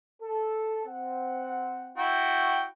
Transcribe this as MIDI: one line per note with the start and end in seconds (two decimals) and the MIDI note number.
0.22 0.82 69
0.86 2.02 60
0.86 2.02 78
1.98 2.64 64
1.98 2.64 66
1.98 2.64 79